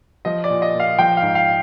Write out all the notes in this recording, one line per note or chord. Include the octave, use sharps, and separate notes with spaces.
F3 D#5
D5
A#2
D#5
A#2 F5
F3 G5
F5
G#2
F5